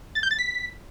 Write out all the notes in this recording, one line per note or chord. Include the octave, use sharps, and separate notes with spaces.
A6
G6
A6
B6